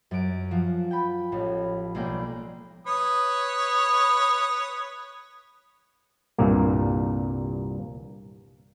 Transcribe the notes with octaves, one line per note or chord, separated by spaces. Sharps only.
F#2 D7
F3 F#4
G5 B5
A1 A2
B1 G#3 A#3 D5 G5
B4 C#5 D#6
C2 G2 A#2 A#3